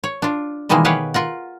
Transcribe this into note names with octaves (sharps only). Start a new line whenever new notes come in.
C#5
D4 F4
B2 D#3 E3 G3 G#3 A#3
G4 G#4 B4 C#5 F5 F#5
F4 A#4 F#5